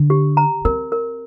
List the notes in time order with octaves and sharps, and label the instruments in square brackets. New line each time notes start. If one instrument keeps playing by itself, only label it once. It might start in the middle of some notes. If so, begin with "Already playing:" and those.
Already playing: [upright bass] D3
[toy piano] G4
A#5
[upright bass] C4 [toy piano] A#4
[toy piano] A#4